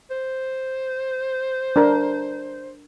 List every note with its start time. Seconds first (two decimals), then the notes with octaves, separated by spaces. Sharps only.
0.10 C5
1.76 D4 A#4